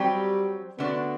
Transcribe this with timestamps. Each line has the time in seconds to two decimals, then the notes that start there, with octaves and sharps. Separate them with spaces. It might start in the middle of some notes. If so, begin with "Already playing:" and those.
Already playing: F#3 G3 C4 G4
0.79 D3 A3 B3 D4 F#4